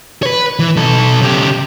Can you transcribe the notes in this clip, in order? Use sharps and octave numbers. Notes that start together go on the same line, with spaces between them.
B4 C#5
E3
B1 A4
C#3 G4